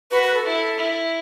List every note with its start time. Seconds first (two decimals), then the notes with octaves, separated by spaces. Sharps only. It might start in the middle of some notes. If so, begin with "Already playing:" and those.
0.11 F#4 B4
0.23 B4
0.34 A4
0.45 E4
0.78 E4